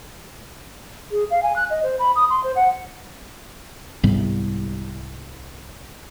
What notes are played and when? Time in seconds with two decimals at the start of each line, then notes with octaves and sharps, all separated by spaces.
1.11 G#4
1.31 F5
1.43 G#5
1.56 F#6
1.70 D#5
1.83 C5
1.99 B5
2.16 D#6
2.30 C6
2.44 C5
2.56 F#5
4.03 C2 G#2 G3 B3